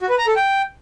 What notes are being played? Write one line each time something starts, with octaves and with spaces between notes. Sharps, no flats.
F#4
B4
A#5
A4
G5